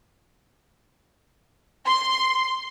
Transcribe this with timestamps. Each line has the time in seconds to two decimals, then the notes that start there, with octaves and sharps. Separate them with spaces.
1.86 C6